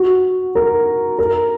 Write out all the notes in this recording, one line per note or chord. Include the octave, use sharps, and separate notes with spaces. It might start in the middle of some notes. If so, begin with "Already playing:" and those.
Already playing: F#4
A#4
A#4